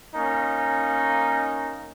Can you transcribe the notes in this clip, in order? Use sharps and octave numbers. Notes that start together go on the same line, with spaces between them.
A#3 C#4 D#4